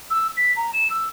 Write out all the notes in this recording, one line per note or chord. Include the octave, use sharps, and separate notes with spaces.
E6
B6
A#5
E7
E6